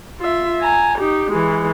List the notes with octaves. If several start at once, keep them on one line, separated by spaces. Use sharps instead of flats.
F4 E5
G#5 A#5
D#4 G4
E3 G#3